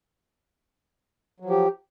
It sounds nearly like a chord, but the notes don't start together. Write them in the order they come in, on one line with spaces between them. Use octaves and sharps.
F#3 F3 G4